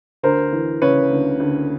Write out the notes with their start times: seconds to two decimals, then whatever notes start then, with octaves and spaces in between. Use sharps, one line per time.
0.23 D2 A#4 C5
0.52 E3
0.82 C#3 B4 C#5
1.11 D2
1.40 D2